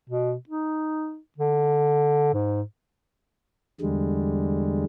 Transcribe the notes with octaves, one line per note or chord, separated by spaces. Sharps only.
B2
D#4
D3
G#2
E2 D3 G3 G#3